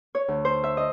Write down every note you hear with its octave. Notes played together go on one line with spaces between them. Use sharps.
C#5
D2
C5
E5
D#5